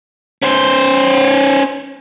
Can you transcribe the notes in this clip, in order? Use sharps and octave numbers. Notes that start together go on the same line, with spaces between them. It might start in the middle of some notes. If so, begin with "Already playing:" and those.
C#4 C5